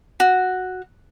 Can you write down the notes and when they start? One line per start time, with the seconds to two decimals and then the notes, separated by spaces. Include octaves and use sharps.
0.20 F#4